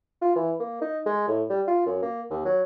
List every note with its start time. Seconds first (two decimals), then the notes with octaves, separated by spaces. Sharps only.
0.22 F4
0.36 E3
0.60 A#3
0.82 D#4
1.06 G#3
1.28 A2
1.50 G3
1.68 F4
1.86 F#2
2.03 A#3
2.31 D#2
2.45 F#3